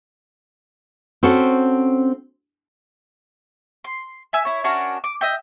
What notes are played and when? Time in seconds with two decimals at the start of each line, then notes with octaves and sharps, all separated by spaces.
1.23 C4 C#4 F#4 A4 C5
3.84 C6
4.33 E5 G#5 E6
4.45 E4 C#5
4.64 C#4 D4 F#4 A#4
5.04 D6
5.21 D#5 E5 G5